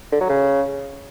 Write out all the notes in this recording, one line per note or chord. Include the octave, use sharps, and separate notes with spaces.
D3
F#3
C#3